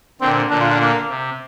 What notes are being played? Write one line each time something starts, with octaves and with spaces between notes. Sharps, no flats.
A#2 D3 C4
A#2 D3 D4
F4
D4
A#3
C3